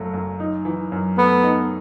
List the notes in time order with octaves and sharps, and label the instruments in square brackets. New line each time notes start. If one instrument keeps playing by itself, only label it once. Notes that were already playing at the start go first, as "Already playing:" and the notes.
Already playing: [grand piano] F#1 F#2 F#3 A3
F#2
D#4
E3
F#2
[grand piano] A3 [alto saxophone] B3
[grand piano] D#4